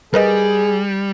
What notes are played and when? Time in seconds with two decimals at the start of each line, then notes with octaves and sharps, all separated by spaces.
0.14 G3 G#4 A#4 B4 D#5